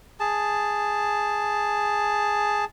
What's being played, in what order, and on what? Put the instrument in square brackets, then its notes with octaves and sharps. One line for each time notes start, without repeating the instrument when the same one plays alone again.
[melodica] G#4 A5